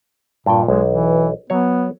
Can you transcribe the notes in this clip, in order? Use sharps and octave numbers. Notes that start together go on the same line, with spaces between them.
G2 A#2 G5
B1 G#3
E3
F#3 B3 C#5